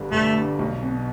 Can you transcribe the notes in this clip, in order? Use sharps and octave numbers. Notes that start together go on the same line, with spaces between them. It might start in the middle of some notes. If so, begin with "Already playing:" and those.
Already playing: G1 G2 D3
G1 A3
G2 D3
B1
B2 B3